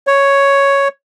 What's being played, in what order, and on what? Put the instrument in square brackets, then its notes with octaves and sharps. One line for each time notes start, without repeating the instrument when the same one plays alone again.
[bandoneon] C#5